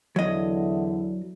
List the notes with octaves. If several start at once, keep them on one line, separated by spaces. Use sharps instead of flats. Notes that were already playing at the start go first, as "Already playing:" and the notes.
E2 D3 F#3 E4 D#5